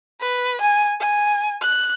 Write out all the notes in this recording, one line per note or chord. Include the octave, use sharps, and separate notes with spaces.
B4
G#5
G#5
F#6